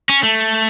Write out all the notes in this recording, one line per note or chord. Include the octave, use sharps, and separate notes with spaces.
C#4
A3